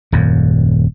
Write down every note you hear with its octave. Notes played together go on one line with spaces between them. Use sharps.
D#1 F#2